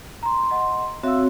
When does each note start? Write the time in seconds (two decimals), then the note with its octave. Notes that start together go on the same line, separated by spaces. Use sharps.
0.23 A#5 C6
0.51 D#5 F#5 C6
1.03 C4 F#4 C#5 E5 F5 E6